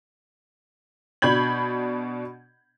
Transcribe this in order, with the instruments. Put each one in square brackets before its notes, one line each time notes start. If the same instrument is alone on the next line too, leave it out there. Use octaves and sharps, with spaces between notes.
[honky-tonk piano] B2 D4 B5 G6 G#6 F#7